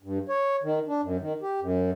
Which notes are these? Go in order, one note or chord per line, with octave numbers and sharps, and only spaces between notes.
G2
C#5
D#3
D4
F#2
D#3
G4
F#2